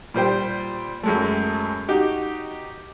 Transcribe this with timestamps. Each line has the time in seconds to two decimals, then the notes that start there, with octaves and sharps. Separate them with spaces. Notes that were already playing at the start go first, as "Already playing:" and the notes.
0.14 A#2 G3 C5 G5
1.03 F#2 G#3 A3
1.88 D#4 F#4 G4